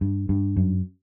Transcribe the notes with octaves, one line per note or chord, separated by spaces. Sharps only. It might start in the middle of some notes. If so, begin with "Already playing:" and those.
G2
G2
F#2